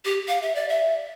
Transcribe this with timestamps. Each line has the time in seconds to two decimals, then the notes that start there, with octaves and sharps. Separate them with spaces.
0.05 G4
0.28 F5
0.42 E5
0.55 D5
0.69 E5